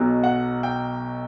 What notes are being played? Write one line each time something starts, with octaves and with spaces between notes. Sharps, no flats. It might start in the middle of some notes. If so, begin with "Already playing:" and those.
Already playing: B1 B2 F#3
F#5
G5